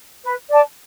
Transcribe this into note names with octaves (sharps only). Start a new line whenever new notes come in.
B4
D5 A5